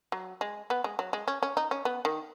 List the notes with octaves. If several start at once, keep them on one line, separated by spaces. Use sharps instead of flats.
F#3
G#3
B3
G#3
F#3
G#3
C#4
C#4
D#4
C#4
B3
D#3